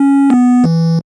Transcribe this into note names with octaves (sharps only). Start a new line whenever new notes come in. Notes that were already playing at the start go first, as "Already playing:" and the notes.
Already playing: C#4
B3
E3